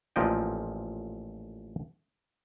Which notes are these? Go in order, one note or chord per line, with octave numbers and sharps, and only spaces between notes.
A1 A#2 F3 D#5 G5